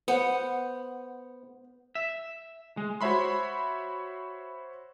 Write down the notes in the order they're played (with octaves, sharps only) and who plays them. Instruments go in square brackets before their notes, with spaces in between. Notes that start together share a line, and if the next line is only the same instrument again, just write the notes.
[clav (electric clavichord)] B3 [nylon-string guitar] C5 F#5
[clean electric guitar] E5
G#3
[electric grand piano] F#4 C5 C#5 E5 B5 C6